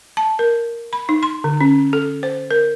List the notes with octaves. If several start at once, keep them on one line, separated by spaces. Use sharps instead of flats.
A5
A#4
B5
D#4
C6
D3
C#4
A4
C5
A#4